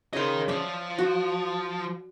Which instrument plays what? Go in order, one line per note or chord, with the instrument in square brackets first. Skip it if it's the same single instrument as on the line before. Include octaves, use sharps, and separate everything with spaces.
[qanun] C#3 C6 [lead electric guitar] A#4 D#5
[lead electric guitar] F3 [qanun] D5 E5
[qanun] F#4